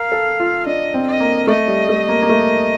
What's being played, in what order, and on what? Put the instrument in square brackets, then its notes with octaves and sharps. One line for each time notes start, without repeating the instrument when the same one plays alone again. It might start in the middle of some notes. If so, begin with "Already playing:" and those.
Already playing: [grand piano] A#4 [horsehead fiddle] F5
[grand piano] A4
F4
[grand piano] D4 [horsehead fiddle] D#5
[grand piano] C4
[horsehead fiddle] D#5
[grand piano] A#3
[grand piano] A3 [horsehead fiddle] D#5
[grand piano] G3
A3
A#3
A#3
A3